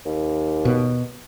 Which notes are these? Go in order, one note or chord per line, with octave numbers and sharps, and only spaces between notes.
D#2
B2